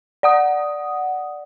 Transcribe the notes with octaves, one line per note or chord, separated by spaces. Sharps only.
D5 F#5 D#6